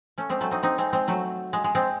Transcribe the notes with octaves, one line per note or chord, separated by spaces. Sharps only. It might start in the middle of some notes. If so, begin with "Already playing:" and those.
A3 C#4
G#3 C4
F#3 A3
C4 D#4
C4 D#4
G#3 C4
G#3 C4
F#3 A3
G#3
G#3
G#3 C4